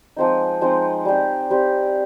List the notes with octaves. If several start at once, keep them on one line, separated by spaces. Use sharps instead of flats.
F3 G#3 C4 D#4
F3 G#3 C4 D#4
G3 C4 G4
G3 C4 G4